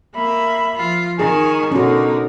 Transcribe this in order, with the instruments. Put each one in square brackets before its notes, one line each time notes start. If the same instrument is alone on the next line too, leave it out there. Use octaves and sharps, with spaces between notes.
[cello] A#3 [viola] E5 B5
[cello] F3 F4
[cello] D#3 [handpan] G#4 [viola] G#5 C#6
[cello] B2 D#4 [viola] D3 A#4 [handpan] C#4 F#4